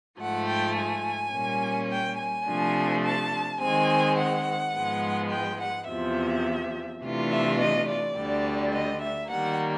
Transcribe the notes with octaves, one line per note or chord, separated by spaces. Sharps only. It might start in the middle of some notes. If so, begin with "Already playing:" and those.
G#2 F3 A3 F#5
G5
G#5
A#2 G3 A#3 C#4
G5
G#5
C3 F3 A3 D4
A5
D#3 G#3 C4 G#5
F#5
G#2 F3 G#3 B3
G5
F#5
E2 C3 F3 E5
C3 E3 A3 D4 F4
E5
D#5
D5
D2 D3 G3
D#5
E5
D#3 G3 A#3 F#5